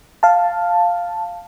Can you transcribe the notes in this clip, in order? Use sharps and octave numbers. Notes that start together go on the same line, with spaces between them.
F5 A5